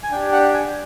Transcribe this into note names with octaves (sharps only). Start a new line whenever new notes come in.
G#5
D4 G4 G5
F#5
G#5